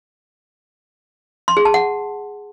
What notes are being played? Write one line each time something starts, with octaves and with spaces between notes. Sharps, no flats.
C6
G#4
A5
F#5